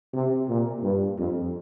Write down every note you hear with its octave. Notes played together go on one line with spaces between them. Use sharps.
C3
A#2
G2
F2